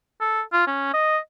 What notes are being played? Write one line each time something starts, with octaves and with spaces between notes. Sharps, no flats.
A4
F4
C#4
D#5